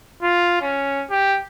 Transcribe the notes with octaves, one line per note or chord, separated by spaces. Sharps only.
F4
C#4
G4